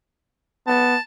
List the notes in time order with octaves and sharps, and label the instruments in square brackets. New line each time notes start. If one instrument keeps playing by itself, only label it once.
[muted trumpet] B3 [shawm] A5